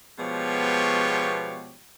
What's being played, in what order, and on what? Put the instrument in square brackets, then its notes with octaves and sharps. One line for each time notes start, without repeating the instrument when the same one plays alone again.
[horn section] B2 F3 G#3 B3 G4 C#5